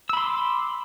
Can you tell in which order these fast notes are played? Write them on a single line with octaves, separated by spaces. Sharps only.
E6 B5 C6 D6